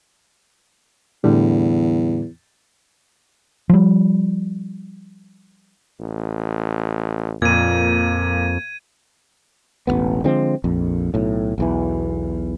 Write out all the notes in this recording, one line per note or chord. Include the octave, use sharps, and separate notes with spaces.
E2 A2 D3 G3
F3 G3
A1
F2 A#2 A#3 G#6 D#7
E1 A1 E2 B3
D3 F3 G#3 C4
A#1 F2
B1 A2
B1 E2 E3